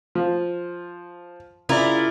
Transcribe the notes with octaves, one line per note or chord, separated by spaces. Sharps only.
F3 F4
C#3 E4 F4 A#4 D5